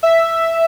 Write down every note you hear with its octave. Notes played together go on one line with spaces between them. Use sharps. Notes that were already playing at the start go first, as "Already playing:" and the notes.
E5